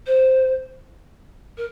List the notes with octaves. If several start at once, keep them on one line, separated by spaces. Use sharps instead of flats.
C5
A#4